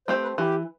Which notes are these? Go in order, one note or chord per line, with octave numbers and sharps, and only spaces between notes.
A3 C4 G4 C5
B4
E3 G4